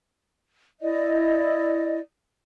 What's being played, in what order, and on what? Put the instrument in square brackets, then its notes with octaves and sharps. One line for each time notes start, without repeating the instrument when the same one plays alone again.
[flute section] E4 D5 D#5